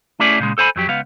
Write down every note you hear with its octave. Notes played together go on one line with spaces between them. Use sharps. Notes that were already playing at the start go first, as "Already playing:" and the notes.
A3 C#4 E4 G#4 D5
A#2 C#3 G#3
A4 C5 G#5 B5
F2 F#3 G4
C#2 B3 F5